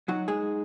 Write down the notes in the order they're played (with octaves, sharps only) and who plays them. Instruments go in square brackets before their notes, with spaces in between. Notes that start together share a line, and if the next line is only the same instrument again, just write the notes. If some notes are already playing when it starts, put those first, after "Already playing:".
[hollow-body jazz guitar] F#3 F#4 [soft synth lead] D#4
[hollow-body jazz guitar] G#3 G#4